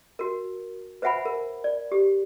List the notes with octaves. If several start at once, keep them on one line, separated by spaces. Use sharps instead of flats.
F#4 A#4
B4 C5 E5 F#5 G#5 B5
A#4
D5
G4